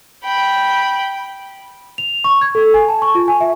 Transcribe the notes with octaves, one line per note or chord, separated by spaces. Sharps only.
G5 B5
F7
C#6
G#6
A4
G#5
A5
C#6
F4
G#5
E5